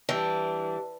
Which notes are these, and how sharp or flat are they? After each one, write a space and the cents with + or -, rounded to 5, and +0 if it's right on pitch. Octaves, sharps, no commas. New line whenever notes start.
E3 +0 G3 +0 D4 +0